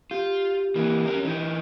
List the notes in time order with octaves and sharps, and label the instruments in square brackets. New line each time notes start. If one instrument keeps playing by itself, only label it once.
[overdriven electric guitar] F4 [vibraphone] G4
[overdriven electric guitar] E3 A#3
C#4 A#4
E3 D#4